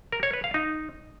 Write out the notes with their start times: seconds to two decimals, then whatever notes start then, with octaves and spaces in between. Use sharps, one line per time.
0.12 A#4
0.23 C#5
0.33 B4
0.44 F5
0.54 D#4